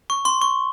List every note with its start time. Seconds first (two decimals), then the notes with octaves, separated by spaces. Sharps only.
0.10 C#6
0.25 C6
0.42 C#6